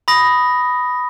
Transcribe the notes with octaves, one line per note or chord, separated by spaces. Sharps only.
B5 D#6 A#6